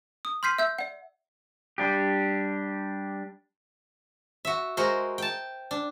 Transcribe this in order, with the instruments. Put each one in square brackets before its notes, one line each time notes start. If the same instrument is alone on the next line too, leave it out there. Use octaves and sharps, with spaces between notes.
[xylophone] D#6
C6 F6 G6 B6 C7 D#7
E5 E6 G6
D5 F#5
[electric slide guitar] G3 D4 G4
[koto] F#4 E5
G#3 F#4 A#4 C5
G5 A5
D4